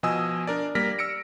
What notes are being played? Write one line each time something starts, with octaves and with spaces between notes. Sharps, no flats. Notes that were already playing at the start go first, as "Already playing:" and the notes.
B2 F3 D#5 G#5 D#6 E6
D4 A#4 D5
G3 A#3 D5 F6 A#6 B6
E6 A#6 C#7 D7